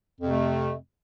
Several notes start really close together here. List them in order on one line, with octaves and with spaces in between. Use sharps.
F2 C3 A3